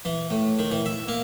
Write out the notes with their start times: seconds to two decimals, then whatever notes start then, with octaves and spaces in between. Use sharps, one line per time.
0.05 E3
0.30 A2
0.59 D#3
0.71 E3
0.86 E5
1.08 A#3